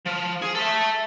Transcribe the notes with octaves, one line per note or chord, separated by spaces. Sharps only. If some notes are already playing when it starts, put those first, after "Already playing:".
F3
G#4
A4 E5